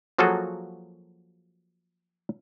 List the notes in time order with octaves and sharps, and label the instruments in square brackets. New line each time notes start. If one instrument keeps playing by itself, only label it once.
[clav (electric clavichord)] F3 F#3 A#3 F#4 G#4 A4